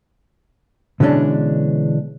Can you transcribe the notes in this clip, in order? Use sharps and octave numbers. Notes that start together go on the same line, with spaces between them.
B2 D3 E3 G#3 C#4 D4